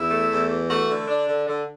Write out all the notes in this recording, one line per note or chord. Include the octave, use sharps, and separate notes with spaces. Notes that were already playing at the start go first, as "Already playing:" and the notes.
Already playing: E2 E4
A3
E2
E3
A3 F#4
D3
D4
D3
D3